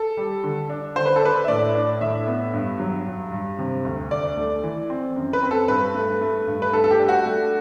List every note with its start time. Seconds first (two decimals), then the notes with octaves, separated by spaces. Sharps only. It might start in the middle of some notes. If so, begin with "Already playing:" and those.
Already playing: A4
0.17 G3
0.44 D3
0.70 D4
0.96 D3 C5
1.06 B4
1.16 A4
1.22 D4 B4
1.44 E5
1.48 A2 D5
1.75 D4
2.01 A2 E5
2.27 B3
2.54 G2
2.80 F#3
3.06 G2
3.32 G2
3.58 C3
3.85 D2
4.11 D2 D5
4.37 A3
4.63 E3
4.90 C4
5.16 F#2
5.33 B4
5.43 C4
5.51 A4
5.68 G2 B4
5.95 A3
6.21 A3
6.47 G2
6.62 B4
6.73 A3 A4
6.84 A4
6.91 G4
6.99 D4
7.08 F#4
7.26 A3